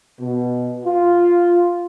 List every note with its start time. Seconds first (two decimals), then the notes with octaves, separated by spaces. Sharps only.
0.19 B2
0.84 F4